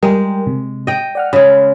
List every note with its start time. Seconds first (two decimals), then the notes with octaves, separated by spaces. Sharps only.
0.03 G3 G#3 A#4 G5
0.47 C3
0.87 D#5 G5
1.15 D5 F#5 F6
1.33 C#3 G#3 B5